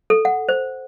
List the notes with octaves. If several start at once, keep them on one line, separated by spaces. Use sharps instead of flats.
A4
F#5
C5